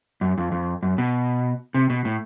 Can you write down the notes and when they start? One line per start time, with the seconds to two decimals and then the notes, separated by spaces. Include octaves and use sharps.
0.21 F#2
0.38 F2
0.52 F2
0.83 F#2
0.98 B2
1.74 C3
1.90 B2
2.05 A2